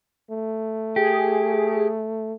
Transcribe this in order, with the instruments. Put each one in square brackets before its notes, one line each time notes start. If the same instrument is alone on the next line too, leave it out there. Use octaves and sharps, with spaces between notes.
[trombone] A3
[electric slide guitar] G4 [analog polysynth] G#4